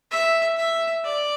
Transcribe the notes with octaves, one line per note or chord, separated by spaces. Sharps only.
E5
E5
D5